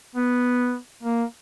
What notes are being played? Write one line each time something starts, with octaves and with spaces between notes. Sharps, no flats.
B3
A#3